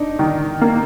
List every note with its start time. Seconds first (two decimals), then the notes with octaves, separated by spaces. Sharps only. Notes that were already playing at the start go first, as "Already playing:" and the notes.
Already playing: D4 D#4
0.19 D#3
0.61 A#3